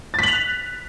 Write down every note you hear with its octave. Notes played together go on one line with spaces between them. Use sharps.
F#6 A6 B6 F7 F#7